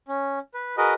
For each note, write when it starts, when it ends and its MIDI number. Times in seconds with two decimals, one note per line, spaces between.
0.08 0.39 61
0.54 0.76 71
0.77 0.94 66
0.77 0.94 68
0.77 0.94 70
0.77 0.94 71
0.77 0.94 75